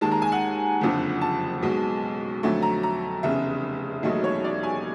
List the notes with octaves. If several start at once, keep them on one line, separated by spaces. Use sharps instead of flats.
D#2 D#3 G#3 A5
A#5
G#5
F#5
F#1 F2 D3 F3
A5
B1 B2 G#3
F2 D3 F#3 A3
A#5
A#5
F1 E2 C#3 E5
E1 D#2 D#3 F#3 A3 D#5
C#5
D5
G#5